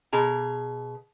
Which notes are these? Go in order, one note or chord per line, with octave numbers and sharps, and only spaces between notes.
B2 G#4 A#5